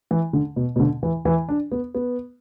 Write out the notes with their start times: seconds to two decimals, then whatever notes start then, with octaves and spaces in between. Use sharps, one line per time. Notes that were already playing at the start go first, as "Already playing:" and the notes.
0.11 E3
0.33 D3
0.56 B2
0.76 B2
0.80 D3
1.03 E3
1.25 E3
1.49 D4
1.72 B3
1.95 B3